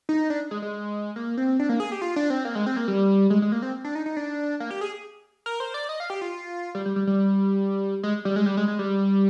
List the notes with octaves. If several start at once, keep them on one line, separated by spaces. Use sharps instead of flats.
D#4
D4
G#3
G#3
A#3
C4
D4
A#3
G#4
G4
F4
D4
C4
A#3
G#3
C4
A#3
G3
G#3
G#3
A#3
C4
D4
D#4
D#4
D4
A#3
G4
G#4
A#4
C5
D5
D#5
F5
G4
F4
G3
G3
G3
G3
G#3
G3
G#3
G3
G#3
G#3
G3